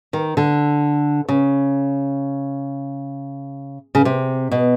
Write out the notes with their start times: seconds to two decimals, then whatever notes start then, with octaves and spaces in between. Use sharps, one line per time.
0.13 D#3
0.37 D3
1.29 C#3
3.95 C#3
4.05 C3
4.51 B2